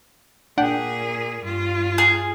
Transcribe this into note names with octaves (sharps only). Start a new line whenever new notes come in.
A#2 D4 G#4 F#5 G5
G2 F4
G#4